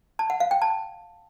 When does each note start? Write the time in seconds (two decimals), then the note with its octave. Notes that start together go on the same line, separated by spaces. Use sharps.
0.19 A5
0.30 F#5
0.40 F5
0.51 G5
0.62 A5